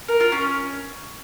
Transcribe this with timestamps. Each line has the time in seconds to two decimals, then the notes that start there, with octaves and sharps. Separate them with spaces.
0.08 A#4
0.20 F4
0.32 C#4